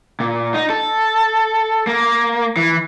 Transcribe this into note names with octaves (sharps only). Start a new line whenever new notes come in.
A#2
D#4
A4
A#3
E3